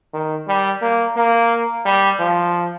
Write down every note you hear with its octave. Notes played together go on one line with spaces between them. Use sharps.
D#3
G3
A#3
A#3
G3
F3